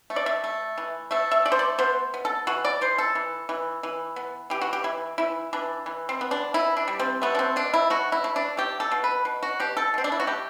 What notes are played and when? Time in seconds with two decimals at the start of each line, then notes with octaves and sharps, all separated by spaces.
0.10 A3
0.16 D5
0.26 E5
0.44 A3
0.78 E3
1.11 A3 E5
1.31 E5
1.46 A3 D5
1.52 C5
1.59 D5
1.79 B3 C5
2.14 B3
2.25 A4
2.47 E3 F#4
2.65 D5
2.81 E3 C5
2.98 A4
3.15 E3
3.49 E3
3.83 E3
4.16 B3
4.50 E3 G4
4.61 F#4
4.73 G4
4.84 E3 E4
5.18 E3 E4
5.53 E3 D4
5.86 E3
6.09 C4
6.21 B3
6.31 D4
6.54 E3 E4
6.77 D4
6.88 G3
7.00 C4
7.22 A3 B3
7.35 D4
7.39 C4
7.56 B2 D4
7.74 E4
7.90 A3 F#4
8.12 E4
8.24 A3
8.36 D4
8.57 A3 G4
8.80 A4
8.92 B2
9.04 B4
9.25 B2
9.43 F#4
9.60 B2 G4
9.77 A4
9.94 B2 C4
10.04 D4
10.12 E4
10.20 F#4
10.27 A3 G4